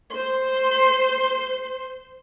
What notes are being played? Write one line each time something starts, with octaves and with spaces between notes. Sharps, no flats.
C5 C6